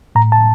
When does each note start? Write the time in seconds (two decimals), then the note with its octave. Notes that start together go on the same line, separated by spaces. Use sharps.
0.15 A2 A#5
0.32 A5